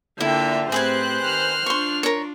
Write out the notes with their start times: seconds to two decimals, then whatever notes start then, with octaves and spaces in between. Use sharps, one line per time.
0.21 D3 A#3 E4 F4 E5 G5
0.72 A2 C4 G4 G#4 B4 C5 G#5 F#6
1.26 D#3 F6
1.66 D4 F4 C6 C#6
2.03 A#4 C#5